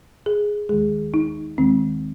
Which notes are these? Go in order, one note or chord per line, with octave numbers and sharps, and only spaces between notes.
G#4
D#2 D#3 G#3 G#4
D#4
D#2 D#3 G#3 C4